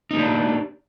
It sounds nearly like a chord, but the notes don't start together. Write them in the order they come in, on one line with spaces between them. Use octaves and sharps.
D#4 A#3 G4 D4